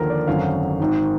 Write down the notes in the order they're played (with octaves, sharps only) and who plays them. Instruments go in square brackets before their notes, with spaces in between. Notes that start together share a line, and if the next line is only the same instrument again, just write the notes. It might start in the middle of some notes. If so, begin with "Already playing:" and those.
Already playing: [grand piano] D#2 D3 F3 A#4
D5
G#1 F#2 D3 F#3 F5
G#1 G#2 D#3